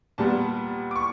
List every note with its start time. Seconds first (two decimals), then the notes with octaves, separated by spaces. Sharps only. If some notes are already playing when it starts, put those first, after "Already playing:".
0.18 A#2 G3 B3 A5
0.91 D6
0.96 C#6